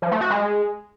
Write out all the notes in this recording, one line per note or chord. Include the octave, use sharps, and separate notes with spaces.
F3
A3
F#4
G#3